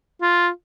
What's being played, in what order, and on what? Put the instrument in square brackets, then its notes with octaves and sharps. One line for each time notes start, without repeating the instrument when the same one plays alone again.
[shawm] F4